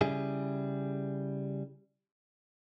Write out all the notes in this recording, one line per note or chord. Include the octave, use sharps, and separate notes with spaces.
C#3 G3 E4 G#4